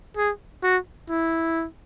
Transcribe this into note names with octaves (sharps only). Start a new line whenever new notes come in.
G#4
F#4
E4